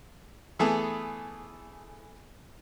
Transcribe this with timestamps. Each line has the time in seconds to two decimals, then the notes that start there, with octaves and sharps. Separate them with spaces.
0.59 E3 A3 B3 G#4 A4